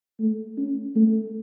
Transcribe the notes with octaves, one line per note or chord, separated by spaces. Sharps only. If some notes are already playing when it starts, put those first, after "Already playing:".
A3
C#4
A3